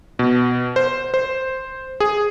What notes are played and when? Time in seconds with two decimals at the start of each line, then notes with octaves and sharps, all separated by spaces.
0.19 B2
0.76 C5
1.14 C5
2.00 G#4